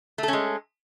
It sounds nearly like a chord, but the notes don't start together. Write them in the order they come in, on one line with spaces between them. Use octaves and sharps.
A3 A4 C#4 G#3